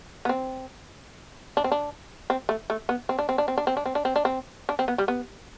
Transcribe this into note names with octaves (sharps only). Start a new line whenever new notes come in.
B3
C4
D4
C4
D4
C4
A3
A3
B3
C4
D4
C4
D4
C4
D4
C4
D4
C4
D4
C4
D4
C4
D4
C4
B3
G3
B3